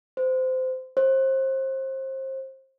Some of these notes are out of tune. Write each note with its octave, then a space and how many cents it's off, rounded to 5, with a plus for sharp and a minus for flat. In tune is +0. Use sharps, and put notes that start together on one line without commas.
C5 -20
C5 +30